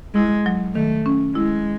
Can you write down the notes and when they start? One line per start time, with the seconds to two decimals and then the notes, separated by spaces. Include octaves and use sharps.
0.15 G#3 E4
0.46 F#3
0.75 D#3 A3
1.06 C#4
1.35 G#3 E4